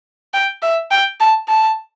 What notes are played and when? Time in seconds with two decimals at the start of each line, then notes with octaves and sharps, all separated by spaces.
0.34 G5
0.62 E5
0.91 G5
1.20 A5
1.48 A5